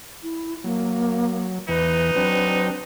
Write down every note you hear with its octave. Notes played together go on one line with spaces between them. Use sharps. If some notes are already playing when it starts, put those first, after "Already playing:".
E4
F#3 A#3
E2 E3 D#4 B4
F#3 C4 D4